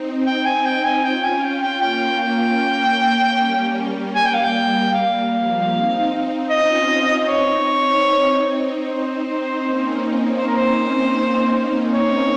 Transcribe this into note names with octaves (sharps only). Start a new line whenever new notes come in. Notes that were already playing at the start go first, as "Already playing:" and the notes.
Already playing: C4 D#4
G5
G#5
G5
G#5
C#4 F4 G5
G#5
G5
G5
A#3 C#4 G5
G5
G3 A#3
G#5
G5
F5
G5
G3 F5
F3
C4 D#4
C4 D#4
C#4 F4 D#5
C4 D#4 C#5
C4 D#4
C5
A#3 C#4
C5
A#4
C5
C#5